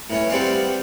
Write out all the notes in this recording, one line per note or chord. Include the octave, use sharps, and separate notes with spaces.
A2 B3 C#4
G3 B3 C4 D5 F5 F#5